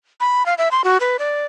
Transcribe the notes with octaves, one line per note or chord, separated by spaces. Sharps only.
B5
F5
E5
C6
F#4
B4
D5